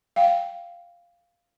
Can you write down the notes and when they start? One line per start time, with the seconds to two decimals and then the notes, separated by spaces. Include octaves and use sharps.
0.16 F5 G5